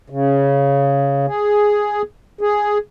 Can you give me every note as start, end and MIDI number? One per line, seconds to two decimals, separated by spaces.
0.10 1.26 49
1.27 2.02 68
2.41 2.78 68